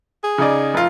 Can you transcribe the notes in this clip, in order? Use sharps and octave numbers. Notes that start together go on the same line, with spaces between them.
G#4
C#3 D#4 D5
F1 F4